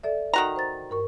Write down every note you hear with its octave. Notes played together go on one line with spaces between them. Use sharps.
A4 D5 E5
D#3 F#4 A#5
C5 A6
G2 A#4 C#6